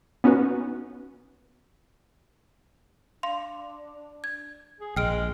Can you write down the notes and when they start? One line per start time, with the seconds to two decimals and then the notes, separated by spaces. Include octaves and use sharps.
0.24 B3 C#4 D#4 F#4 B4
3.23 D4 F5 C6
4.24 G#6
4.80 G#4
4.96 A#1 G#3 G5 F6 D7